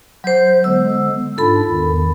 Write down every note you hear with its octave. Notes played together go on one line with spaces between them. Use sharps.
F#3 C5 G6
D3 G#3 B3 E6
G#2 D4 F4 A4 B5
E2 D#3